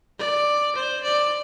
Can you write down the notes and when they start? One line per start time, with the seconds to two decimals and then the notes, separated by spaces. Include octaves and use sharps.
0.19 D5
0.76 C5
1.03 D5